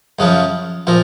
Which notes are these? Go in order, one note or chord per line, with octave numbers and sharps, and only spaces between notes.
F#2 C#3 F3
A#2 F3